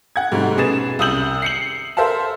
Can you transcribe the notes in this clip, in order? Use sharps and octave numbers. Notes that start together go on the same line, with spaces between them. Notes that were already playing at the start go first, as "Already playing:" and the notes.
F#5 G#6
G#2 C3 G3 A3 F#4
B2 C#4 G#4 B4 A6 E7
C2 F#2 D#6 E6 G6 F#7
C7 C#7 F#7
A4 A#4 C5 E5 F5 A5